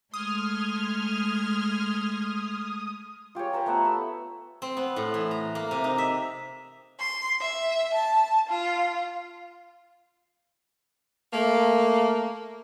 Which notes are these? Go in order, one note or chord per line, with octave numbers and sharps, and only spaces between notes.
G#3 A3 C6 D#6 F6 G#6
F4 G4 G#4 C#5
G4 B4 C5 A#5
A3 B3 E5 F#5
E6
C4
B3
A2
E3
A#5
A#3
C3
D#4
E5
C6
E5
A5
F4
A3 A#3